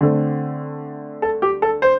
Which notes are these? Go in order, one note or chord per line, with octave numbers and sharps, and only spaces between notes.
D3 A3 C4
A4
G4
A4
C5